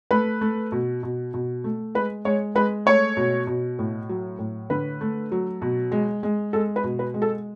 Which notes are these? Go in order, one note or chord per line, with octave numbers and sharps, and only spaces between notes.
A3 B4
A3
B2
B2
B2
A3
G#3 B4
G#3 C#5
G#3 B4
A3 C#5
B2
B2
A2
F#3
A2
D3 B4
A3
F#3
B2
G#3
G#3
G#3 A4
B4
B2
B4
G#3
A4